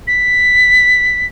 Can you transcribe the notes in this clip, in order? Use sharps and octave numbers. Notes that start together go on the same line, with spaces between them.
B6